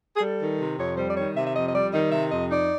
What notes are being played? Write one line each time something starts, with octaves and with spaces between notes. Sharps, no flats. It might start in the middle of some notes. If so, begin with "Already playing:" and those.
G#4
G3 A4
D#3
C3
F2 C#5
G3 C5
D5
D#3 C#5
C3 E5
E5
F2 D#5
D#5
G3 D5
D#3 D#5
C3 E5
F2 D#5
D#4 D5